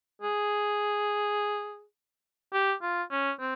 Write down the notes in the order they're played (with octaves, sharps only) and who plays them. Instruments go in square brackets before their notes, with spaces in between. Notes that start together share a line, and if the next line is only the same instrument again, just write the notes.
[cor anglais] G#4
G4
F4
C#4
C4